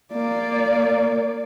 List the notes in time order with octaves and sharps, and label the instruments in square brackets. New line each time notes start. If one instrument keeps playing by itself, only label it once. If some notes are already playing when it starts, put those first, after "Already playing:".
[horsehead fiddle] A#3 D5